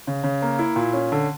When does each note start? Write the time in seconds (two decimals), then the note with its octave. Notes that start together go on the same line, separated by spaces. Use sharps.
0.07 C#3
0.24 C#3
0.42 A#3
0.59 E4
0.76 A#2
0.93 C#4
1.12 D3